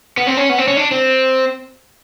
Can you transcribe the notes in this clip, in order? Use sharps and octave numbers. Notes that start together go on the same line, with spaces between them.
B3
C4
C#4
B3
C4
C#4
D4
C4